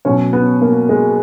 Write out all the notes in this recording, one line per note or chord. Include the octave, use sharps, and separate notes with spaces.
B2 F#3 C#4
B3
A#3
G#3